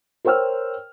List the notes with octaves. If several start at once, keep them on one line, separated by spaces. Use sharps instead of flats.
A#4 C5 C#5 G5 E6 F6